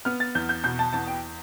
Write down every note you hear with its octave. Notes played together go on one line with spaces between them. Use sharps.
B3 F6
A6
E2 G6
G6
B2 G6
A5
E2 A5
G5